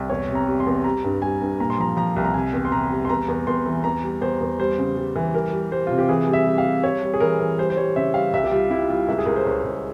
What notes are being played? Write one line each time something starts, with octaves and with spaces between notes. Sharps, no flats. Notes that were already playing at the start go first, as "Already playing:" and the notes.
Already playing: C2
E2 C#5
C3
A#5
G3
C6
E2
G3 A#5
G2
G3 G#5
G2
A#2 A#5
C6
F3 A#5
F3 A#5
C2
A#5
C3 G#5
E2
C6
C3 A#5
G3
C6
E2 A#5
E2
E2 C6
E3
E2 A#5
G3
E2 C5
E2
G3 C5
C#3
G3
E3
G3 A#4
G3
G3 C5
C3 F4
G4
E3 G#4
G3
E5
G3
F5
G3
G3 C#5
G3
G#4
E3 A#4
E3
G3 C5
C5
G3 C#5
C#3 E5
G3 F5
C2 E5
G4
G3 F4
G3 E4
G3 F4
C#2 E5
G#4
C#2 A#4
C5
C#2 C#5
C#2